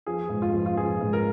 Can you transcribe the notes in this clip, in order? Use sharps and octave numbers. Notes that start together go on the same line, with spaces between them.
F3 G#4
G#2
F4
F3
F4
F3 G#4
G#2
A#4